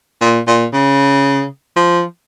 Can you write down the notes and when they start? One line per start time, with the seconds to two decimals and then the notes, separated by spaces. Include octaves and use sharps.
0.21 A#2
0.47 A#2
0.73 C#3
1.76 F3